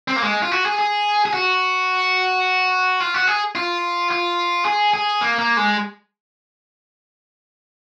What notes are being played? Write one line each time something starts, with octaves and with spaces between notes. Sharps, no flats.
C4
A#3
G#3
F4
F#4
G#4
G#4
G#4
F#4
F4
F#4
G#4
F4
F4
G#4
G#4
A#3
A#3
G#3